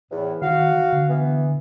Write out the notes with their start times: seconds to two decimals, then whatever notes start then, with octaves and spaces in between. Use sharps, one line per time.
0.11 E2 A2
0.42 D#3 F#4 F5
0.93 D3
1.09 E3 B3